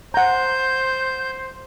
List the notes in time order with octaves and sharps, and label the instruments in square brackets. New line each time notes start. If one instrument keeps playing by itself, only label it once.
[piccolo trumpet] C5 [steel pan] F#5 A#5 [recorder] G6